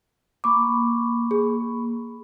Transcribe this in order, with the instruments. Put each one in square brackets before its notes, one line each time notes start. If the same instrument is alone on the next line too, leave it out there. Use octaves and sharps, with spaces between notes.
[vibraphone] A#3 B5 C#6 [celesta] D6
[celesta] G#4